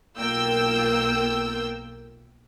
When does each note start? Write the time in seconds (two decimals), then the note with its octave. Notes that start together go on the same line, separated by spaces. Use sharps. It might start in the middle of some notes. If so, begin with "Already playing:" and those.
0.19 B1 A#3 F4 G5 E6 G6